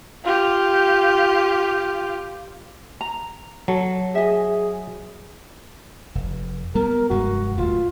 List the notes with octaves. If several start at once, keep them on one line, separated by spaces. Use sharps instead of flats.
F4 G4
A#5
F#3 A4
G#4 D#5 E5
F1
G3 B3 A#4
F1 G2 G#3 F#4
D1 A3 F4